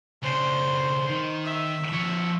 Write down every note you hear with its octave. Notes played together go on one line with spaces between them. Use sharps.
C#3 D4 C5
D#3
E5
F3 C#5